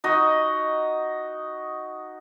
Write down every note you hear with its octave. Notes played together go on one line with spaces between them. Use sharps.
D#4 F#4 D#5